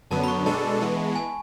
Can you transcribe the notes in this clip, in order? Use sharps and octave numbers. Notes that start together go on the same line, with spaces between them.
F#2 D3 F#3 B3 A5
B5
C#6
B2 G#3 D4 A4 A5
E3 G#3 B3
G#5